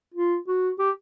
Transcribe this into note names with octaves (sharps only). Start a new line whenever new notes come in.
F4
F#4
G4